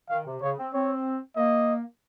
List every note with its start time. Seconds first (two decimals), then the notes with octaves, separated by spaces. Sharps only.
0.09 D#3 F5
0.26 C3
0.41 C#3 C#5
0.58 C4
0.73 C4 C#5
1.36 A#3 D#5